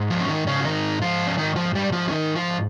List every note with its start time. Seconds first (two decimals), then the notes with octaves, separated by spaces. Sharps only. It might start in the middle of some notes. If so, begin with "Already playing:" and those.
Already playing: G#2
0.10 F3 F4
0.21 C#4
0.28 D#3 D#4
0.47 C#3 C#4
0.61 F4
0.65 D#3 D#4
1.02 F3 F4
1.27 C#4
1.38 D#3 D#4
1.56 F3 F4
1.75 G3 G4
1.93 F3 F4
2.08 C#4
2.11 D#3 D#4
2.35 F3 F4